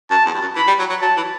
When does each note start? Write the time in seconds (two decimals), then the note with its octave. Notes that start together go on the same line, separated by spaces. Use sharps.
0.11 F#2 A5
0.26 E2
0.34 G2
0.41 F#2
0.56 E3 B5
0.68 G3
0.79 F#3
0.90 F#3
1.02 F#3 A5
1.17 E3